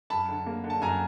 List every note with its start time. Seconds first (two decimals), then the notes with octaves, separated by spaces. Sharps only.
0.10 F#2 A5 B5
0.28 D3
0.46 A#3
0.64 D3
0.70 A5
0.82 F#2 G#5 A#5